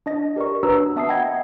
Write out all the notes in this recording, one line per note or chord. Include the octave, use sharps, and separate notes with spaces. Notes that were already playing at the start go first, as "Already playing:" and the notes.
D4 D#5 A#6
G4 A#4 D5 C#6
D4 F#4 B4 C#5 A#5 E6
B3 E5 A5 D#6 E6 C7
D#5 F#5 G5 B5 G#6 A#6